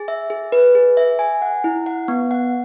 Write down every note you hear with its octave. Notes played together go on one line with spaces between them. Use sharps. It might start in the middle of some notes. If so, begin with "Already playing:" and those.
Already playing: G#4
E5
G#4
B4
G#4
E5
G#5
F#5
E4
F#5
B3
F#5